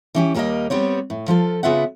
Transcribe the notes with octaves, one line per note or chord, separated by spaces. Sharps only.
E3 C#4 G4
D#2 G3 A#3 A4 A#4 D#5
G3 B3 C4 C#5
A2
F3 F4 A4
C#3 B3 F4 E5 F#5